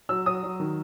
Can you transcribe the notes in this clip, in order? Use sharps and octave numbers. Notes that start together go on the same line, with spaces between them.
F#3 E6
F#3 D#6
F#3
D#3